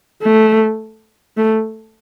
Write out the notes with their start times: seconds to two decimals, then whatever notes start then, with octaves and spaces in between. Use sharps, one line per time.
0.22 A3
1.37 A3